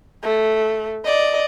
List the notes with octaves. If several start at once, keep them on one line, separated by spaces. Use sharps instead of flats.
A3
D5 D#5